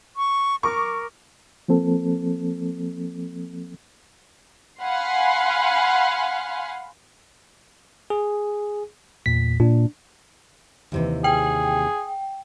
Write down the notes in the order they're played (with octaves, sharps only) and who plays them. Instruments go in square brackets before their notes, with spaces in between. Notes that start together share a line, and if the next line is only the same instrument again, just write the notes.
[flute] C#6
[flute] A#4 [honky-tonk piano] C#6 D6
[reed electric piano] F3 A#3 C4 A4
[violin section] F5 F#5 G#5 B5 C6
[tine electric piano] G#4
E2 A#2 B6
[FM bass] A#2 [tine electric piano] D4
[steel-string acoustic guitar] D#2 C3 E3
[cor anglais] G#4 [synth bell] G5